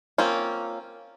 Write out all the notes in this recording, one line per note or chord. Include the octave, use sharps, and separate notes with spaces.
A#3 C4 C#4 F4